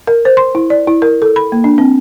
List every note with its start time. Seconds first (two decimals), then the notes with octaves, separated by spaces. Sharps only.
0.07 A#4
0.25 C5
0.37 C6
0.55 E4
0.70 D5
0.87 E4
1.02 A#4
1.22 A4
1.36 B5
1.52 A#3
1.64 D4
1.78 C4